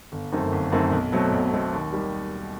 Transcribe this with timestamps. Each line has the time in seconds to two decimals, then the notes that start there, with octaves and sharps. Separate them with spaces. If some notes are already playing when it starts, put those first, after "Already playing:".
0.12 G1
0.32 F#2 D#3 A3 C4
0.52 G1
0.72 F#2 D#3 A3 C4
0.92 B1
1.12 B2 F#3 A3 C4
1.32 B1
1.52 B2 F#3 A3 C4
1.73 D#2
1.93 D#3 G3